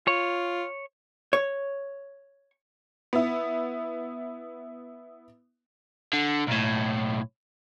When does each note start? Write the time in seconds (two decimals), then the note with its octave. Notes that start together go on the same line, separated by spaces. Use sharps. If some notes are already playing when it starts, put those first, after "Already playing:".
0.07 F4 C#5
1.33 C#5
3.13 B3 E4
6.13 D3
6.48 B1 A2